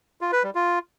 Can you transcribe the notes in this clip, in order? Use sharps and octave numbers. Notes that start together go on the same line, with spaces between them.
F4
B4
G3
F4